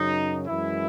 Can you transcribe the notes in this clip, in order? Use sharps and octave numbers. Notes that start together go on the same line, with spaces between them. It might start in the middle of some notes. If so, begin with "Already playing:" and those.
Already playing: F#2 C#3 F#3 D#4
F#2 E3 G#3 E4